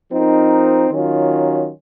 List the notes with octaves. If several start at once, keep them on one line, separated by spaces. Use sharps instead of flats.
F3 C4 D#4 A#4
D#3 F#3 C#4 F4